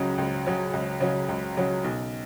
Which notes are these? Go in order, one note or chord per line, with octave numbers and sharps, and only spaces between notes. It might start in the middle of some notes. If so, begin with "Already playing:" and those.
Already playing: C#2 C#3 F#3 C#4
C#2
C#3 F#3 C#4
C#2
C#3 F#3 C#4
C#2
C#3 F#3 C#4
B1